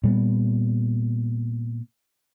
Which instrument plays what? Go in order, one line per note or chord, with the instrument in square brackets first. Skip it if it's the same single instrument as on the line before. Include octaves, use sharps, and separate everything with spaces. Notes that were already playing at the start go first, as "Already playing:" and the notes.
[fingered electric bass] A#2 G3 A#3 B3